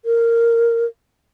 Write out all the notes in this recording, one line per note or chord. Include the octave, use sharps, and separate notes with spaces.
A#4